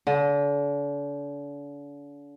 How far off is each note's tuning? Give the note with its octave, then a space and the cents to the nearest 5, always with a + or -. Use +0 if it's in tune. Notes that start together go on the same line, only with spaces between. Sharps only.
D3 -40